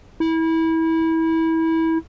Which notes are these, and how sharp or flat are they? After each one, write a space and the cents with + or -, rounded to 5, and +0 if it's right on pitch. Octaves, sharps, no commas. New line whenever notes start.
E4 -25